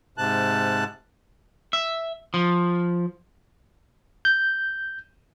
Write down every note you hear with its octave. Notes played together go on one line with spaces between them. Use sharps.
G#2 C3 A5 F#6
E5
F3
G6